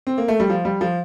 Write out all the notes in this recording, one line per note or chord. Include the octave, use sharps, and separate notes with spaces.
C4
A#3
A3
G3
F3
G3
F3